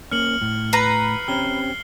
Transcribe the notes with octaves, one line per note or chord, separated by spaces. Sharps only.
A#3 C#4 F6 C#7 F#7
A2
B4 A#5 C7
C4 C#4 G4 F6 G7